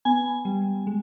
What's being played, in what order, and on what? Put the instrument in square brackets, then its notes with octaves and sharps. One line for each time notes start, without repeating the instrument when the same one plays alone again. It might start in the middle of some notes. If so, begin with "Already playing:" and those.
[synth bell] B3 G#5
G3
G#3